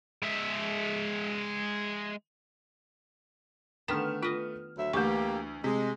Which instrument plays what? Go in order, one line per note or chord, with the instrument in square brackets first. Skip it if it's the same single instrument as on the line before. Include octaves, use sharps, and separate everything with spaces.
[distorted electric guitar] G#3 E5
[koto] D3 D#3 B3 [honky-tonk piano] A3 F6 E7
[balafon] F4 [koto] B4 D#5
[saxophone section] D2 F#3 E5
[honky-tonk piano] D2 [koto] E3 [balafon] A3 C#6 [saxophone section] A#3 G4
[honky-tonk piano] C3 [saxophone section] G#3